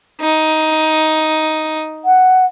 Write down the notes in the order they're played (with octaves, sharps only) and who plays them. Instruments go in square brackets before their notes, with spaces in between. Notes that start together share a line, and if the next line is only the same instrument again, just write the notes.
[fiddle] D#4
[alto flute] F#5